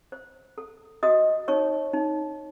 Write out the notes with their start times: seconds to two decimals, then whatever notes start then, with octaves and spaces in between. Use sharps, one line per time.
0.12 C5
0.58 A4
1.03 F#4 D#5 D#6
1.48 D#4 C#5 C#6
1.93 D#4